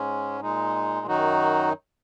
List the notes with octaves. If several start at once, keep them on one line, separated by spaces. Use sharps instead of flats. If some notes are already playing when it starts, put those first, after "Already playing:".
Already playing: G#2 G#3 C#4
A#2 G#3 D#4
F#2 D#3 F#3 D#4 F#4